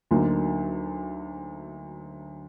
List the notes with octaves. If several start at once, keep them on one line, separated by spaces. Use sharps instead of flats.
D2 D3 F#3 A#3 D#4